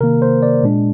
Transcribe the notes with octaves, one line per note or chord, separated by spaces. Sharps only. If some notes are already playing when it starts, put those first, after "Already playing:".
C3 D#3 A#3 A#4
C5
D5
A#2 G#3 D4